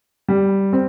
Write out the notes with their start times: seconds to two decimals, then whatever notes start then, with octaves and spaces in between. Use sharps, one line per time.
0.29 G3
0.73 C4